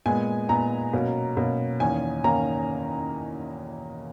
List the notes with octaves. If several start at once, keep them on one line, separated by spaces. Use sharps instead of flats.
A#2 G#3 B3 G#5
A#2 G#3 B3 A#5
B2 F#3 A#3 C#4
B2 F#3 A#3 C#4
E2 D#3 A#3 C#4 G#5
D#3 A#3 C#4 A#5